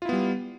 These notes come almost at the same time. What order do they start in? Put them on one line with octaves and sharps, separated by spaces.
F4 E4 B3 G3